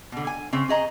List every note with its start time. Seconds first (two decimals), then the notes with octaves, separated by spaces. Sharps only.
0.12 B2 D3
0.27 G#5
0.53 C#3 C4 C#5
0.68 C#4 G#4 D#5 A#5